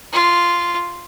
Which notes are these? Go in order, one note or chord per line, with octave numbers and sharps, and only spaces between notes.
F4